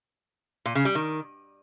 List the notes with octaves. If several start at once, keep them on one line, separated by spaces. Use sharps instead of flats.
A#2
C#3
G3
D#3